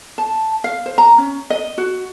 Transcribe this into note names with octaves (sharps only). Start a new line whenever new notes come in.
A5
F5
C5
A#5
C#4
D#5
F#4